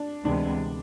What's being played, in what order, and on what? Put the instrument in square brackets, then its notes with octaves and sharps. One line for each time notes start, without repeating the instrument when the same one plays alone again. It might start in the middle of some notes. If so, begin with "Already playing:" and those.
Already playing: [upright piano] D4
[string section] D2 C3 E3 G#3 B3 [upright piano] D4